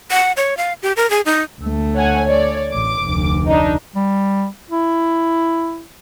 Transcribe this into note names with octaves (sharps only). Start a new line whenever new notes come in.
F#5
C#5
F5
G4
A#4
G#4
D#4
D2 A3
C#5 F#5 G#5
C#5 D5
A1 D6
F1 D2
D4 D#4
G3
E4